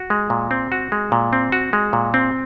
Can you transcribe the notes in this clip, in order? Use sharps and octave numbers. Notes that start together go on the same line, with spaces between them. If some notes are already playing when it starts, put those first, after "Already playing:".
Already playing: F#4
G#3
A#2
C4
F#4
G#3
A#2
C4
F#4
G#3
A#2
C4